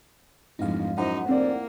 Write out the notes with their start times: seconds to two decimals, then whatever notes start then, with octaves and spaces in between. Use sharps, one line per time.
0.59 D1 F2 G#2 D#4 F5
0.98 F#2 D#4 E4 C5 F#5
1.29 F1 A#3 C4 D5